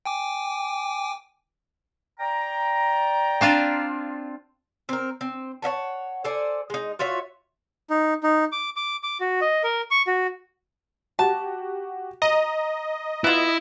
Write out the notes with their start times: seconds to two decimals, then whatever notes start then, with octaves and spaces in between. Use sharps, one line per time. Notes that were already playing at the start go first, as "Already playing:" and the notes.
0.05 G5 G#5 D6
2.20 D5 G5 A#5
3.41 C4 D4 F4
4.89 C4 A#4
5.21 C4
5.62 C#5 E5 F#5 A5
6.24 A4 C5 D5 G#5
6.70 G#3 D#4
6.99 F4 F#4 C#5 E5
7.90 D#4
8.23 D#4
8.52 D6
8.76 D6
9.03 D6
9.20 F#4
9.41 D#5
9.64 A#4
9.91 C#6
10.07 F#4
11.19 F#4 G4 A5
12.22 D#5 A#5
13.24 B3 E4 F4